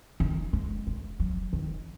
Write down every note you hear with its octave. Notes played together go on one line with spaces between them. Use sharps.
D#3
G#3
G#3
F#3
D#3